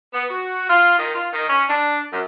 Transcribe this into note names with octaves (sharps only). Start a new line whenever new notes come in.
B3
F#4
F4
D#3
F4
D#3
C#4
D4
F#2